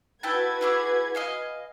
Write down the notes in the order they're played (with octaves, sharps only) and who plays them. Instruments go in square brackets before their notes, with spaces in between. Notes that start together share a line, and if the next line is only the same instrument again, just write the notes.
[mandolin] E4 G5 A5 [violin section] F#4 B4 G#6
[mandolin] E4 G#4 D6
D#5 F5 G#5